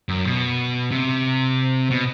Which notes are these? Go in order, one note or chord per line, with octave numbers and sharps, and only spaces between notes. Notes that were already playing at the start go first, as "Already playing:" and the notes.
F#2
B2
C3
B2